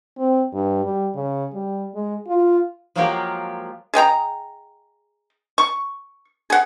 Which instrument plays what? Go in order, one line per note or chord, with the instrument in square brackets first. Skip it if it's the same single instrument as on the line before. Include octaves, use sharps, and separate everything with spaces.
[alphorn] C4
G2
G3
C#3
G3
G#3
F4
[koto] F3 F#3 G#3 A#3 F4 G4
[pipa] G#4 D#5 G5 A#5
C#6
G#4 F#5